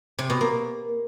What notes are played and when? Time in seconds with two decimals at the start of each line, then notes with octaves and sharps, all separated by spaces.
0.18 C3
0.30 B2
0.41 A#3